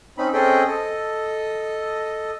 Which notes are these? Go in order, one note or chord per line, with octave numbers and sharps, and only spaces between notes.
C4 C#4 D#4 B5
C4 C#4 G#4 A4 D#5 G5
A4 D#5